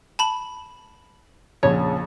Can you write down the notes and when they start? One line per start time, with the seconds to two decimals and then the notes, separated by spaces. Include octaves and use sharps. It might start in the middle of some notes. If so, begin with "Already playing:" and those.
0.19 A5 B5 F#7
1.63 A#1 F2 C#3 C#5